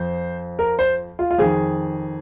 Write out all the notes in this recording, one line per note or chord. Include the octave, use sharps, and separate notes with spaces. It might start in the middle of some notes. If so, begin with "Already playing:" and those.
Already playing: F2 F3 C5
A#4
C5
F4
F4
F2 D#3 G#4